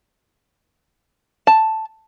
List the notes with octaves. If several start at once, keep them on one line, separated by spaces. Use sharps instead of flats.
A5